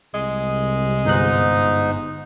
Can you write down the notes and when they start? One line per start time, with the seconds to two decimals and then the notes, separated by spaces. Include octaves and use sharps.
0.14 C2 G#3
1.05 G1 G#2 D#4 F#6